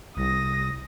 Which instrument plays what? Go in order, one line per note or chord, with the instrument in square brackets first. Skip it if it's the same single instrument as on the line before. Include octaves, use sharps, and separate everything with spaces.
[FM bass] C2 [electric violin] D#6 A#6